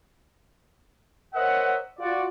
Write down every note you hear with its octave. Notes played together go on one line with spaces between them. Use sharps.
A#4 C5 C#5 D#5 E5 F#5
F4 F#4 D5